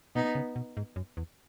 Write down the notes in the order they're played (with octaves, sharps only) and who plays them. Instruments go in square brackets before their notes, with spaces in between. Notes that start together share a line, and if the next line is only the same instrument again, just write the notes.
[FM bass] B2 [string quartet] B3 D#4
[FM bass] C#3
B2
G#2
F#2
E2